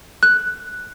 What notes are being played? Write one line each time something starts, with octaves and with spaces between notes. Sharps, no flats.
F#6